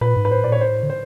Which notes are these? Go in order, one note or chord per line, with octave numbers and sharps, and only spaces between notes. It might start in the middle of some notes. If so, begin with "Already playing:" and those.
A#2 B4
G#2
B4
A2 C5
A#2 D5
C#5
A2 C5
D3
C5